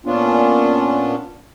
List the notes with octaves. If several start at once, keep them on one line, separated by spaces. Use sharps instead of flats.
A#2 B3 C#4 D4 F4